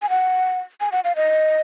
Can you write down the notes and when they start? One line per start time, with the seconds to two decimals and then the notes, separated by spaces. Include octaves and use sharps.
0.02 G#5
0.10 F#5
0.80 G#5
0.92 F#5
1.04 F5
1.16 D#5